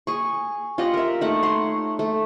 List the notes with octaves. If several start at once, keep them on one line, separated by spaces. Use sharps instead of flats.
G#4 C#6
F4 G4 D#5 F#5
A#4 E5
A3 D#4 F#5
C#5 F#5 C6
A3